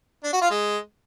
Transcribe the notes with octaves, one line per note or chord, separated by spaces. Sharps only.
D4
F#4
F4
G#3